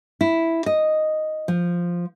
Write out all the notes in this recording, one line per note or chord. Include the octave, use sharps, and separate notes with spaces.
E4
D#5
F3